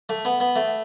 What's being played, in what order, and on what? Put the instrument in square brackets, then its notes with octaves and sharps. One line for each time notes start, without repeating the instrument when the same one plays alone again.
[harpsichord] A3
B3
B3
A3